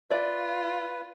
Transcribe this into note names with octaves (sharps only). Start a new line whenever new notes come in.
F4 B4 D5 E5